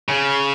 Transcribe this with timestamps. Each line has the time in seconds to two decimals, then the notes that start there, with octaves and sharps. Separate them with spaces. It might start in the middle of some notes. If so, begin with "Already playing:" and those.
0.08 C#3